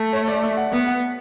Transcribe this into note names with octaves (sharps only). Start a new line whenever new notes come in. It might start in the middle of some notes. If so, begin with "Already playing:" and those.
Already playing: A3
C#5
D5
E5
F#5
B3 E5
F#5